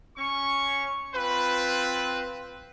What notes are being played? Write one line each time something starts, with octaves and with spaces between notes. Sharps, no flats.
C#4 C#6
C4 F4 B4